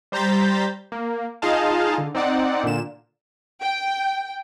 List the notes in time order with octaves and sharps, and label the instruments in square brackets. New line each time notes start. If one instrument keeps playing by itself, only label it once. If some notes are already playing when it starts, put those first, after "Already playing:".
[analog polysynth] G3 C5 A#5 G6 A6 B6
A#3
D#4 F4 G#4 D#5 F5 A5
D3
C4 D#4 D5 F#5
A#2 D3 E7
[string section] G5